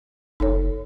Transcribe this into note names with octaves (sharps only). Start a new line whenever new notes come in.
F#1 D#4 A4 C#5